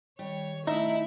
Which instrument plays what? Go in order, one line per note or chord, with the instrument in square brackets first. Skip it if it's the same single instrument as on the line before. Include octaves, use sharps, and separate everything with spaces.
[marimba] D#3 [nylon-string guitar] G3 [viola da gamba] C#5
[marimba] A3 [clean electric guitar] D#4 [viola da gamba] E4 [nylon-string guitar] E5